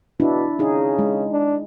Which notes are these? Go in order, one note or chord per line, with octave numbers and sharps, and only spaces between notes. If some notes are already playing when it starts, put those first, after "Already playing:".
B2 D4 E4
C#3 D#4 G#4
G#3
D4